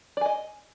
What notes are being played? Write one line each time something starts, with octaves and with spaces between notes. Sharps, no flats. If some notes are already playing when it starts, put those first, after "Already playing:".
D5 D#5 G#5